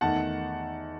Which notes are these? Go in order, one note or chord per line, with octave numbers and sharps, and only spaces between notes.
E2 D#3 A3 D#4 F#5 A5